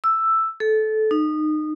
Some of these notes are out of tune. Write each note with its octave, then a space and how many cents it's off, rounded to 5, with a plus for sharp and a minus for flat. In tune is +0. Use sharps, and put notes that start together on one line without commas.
E6 +5
A4 -20
D#4 -25